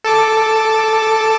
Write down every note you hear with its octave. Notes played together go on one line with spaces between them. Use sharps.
A4 A5 D6